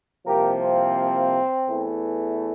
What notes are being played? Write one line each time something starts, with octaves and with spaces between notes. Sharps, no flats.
C2 C3 F3 A#3 G4 A#4
C4
E2 E3 A3